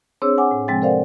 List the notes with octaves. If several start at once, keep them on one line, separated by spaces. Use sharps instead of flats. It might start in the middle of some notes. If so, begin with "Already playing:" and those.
C4 D4 G#4 C5 C#5 E6
F#5 G#5 D6
A2
C3 F3 G#3 C4 G5 A6
A4 A#4 C5 D5 F5 F#5